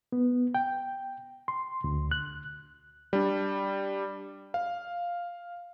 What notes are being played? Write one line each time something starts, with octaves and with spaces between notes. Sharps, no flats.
B3
G5
C6
D2
F#6
G3 D4
F5